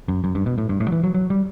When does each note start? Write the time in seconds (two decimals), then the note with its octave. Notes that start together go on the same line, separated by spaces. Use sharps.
0.08 F#2
0.24 F#2
0.35 G2
0.46 B2
0.58 A2
0.69 G2
0.80 A2
0.88 F#3
0.92 E3
1.04 F#3
1.15 F#3
1.30 G3